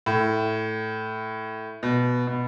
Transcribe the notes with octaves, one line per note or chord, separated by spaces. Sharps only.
A2
B2
B2